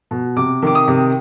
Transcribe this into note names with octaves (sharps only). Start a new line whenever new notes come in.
B2
C3 D6
D#3 D6
D#6
C3